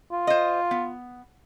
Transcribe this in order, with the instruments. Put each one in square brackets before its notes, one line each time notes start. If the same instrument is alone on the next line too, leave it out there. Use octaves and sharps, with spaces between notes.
[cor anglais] F4
[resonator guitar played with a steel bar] C5 D#5
B3